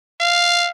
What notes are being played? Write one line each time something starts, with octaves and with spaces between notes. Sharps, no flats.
F5